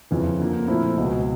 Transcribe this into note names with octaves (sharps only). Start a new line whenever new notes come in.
F2 C#3 E3
D3 F3 A#3
A#2 F3 A3 C4 E4
C#2 B2 G#3